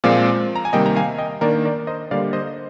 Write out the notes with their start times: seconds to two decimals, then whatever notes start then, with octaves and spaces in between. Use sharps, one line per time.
0.04 A#2 F3 G#3 C4 D5 F5
0.56 A#5
0.65 G#5
0.73 C3 D#3 G3 A#3 D#5 G5
0.86 A#5
0.96 F5 G#5
1.18 D#5 G5
1.41 D#3 A#3 D4 A#4 D5
1.65 A#4 D5
1.87 C5 D#5
2.11 D3 G3 A#3 D5 F5
2.33 C5 D#5